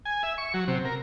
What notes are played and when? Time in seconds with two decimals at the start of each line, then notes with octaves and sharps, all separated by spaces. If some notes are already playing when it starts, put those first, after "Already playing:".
0.05 G#5
0.23 E5
0.38 C#6
0.54 F#3
0.68 C3
0.85 A#4